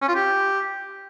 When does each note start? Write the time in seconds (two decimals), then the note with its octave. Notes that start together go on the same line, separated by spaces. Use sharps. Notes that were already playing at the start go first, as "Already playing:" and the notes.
0.02 C#4
0.08 F4
0.15 G4